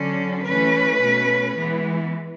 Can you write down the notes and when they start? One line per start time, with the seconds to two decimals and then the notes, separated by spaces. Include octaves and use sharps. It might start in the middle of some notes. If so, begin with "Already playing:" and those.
Already playing: D3 F#3 C#4
0.46 E3 A3 C#4 B4
1.01 B2 A3 C#4
1.56 E3 G#3 B3